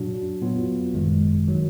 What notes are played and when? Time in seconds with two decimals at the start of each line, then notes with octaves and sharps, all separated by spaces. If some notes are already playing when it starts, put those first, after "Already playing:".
Already playing: A#2 F#3 D4 F#4
0.41 A#2 F#3 B3 F4
0.93 G#1 F#2 D#3 G#3
1.47 D#3 F#3